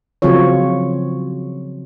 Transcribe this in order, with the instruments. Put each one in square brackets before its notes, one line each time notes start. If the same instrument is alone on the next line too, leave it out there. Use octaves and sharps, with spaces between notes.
[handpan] C#3 F3 F#3 C4 F4 C#5